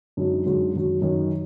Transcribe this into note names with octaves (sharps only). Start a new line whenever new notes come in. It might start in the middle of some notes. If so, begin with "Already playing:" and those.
F#2 D3 G#3 D#4 F#4
F#2 D3 G#3 D#4 F#4
F#2 D#3 F#3
F#2 D#3 F#3